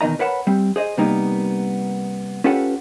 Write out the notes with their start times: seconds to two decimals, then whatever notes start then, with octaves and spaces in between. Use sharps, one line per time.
0.01 E2 B2 D#3 D#5 A#5
0.19 A#4 B4 C#5 F#5 A5 B5
0.47 G3 C4
0.76 G#4 C5 D#5
0.97 C3 G3 A#3 B3 D#4 A#4
2.44 C#4 F4 G4 A4 B4 F#5